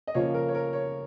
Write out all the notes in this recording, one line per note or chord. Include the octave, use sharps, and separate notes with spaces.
D#5
C#3 F3 A#3 C#5
A#4
C#5
A#4
C#5